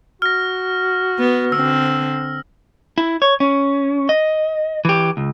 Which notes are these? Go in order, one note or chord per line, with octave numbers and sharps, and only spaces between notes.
F#4 F6 A#6
B3
D3 C4 E6
E4
C#5
C#4
D#5
E3 G4
C#2